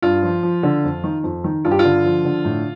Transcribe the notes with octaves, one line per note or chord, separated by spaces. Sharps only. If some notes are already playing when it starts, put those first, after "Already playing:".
G2 F4
F3
F3
D3
F2
D#3
F2
D#3
G2 F4
G4
F4
D3
F3
D3
A2